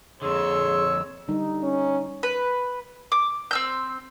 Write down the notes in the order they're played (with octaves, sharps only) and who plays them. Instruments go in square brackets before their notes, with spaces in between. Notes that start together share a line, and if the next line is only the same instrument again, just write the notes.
[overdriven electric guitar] F2 D3 [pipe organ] G#4 [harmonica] C#5 C6 [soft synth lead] E6
[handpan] D3 G3 D#4
[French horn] C#4
[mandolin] B4
D6
C4 E6 G6